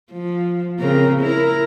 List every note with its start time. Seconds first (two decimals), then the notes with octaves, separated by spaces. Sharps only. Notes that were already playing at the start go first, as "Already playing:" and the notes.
0.12 F3
0.80 C#3 C4 A#4
1.20 E4 A#4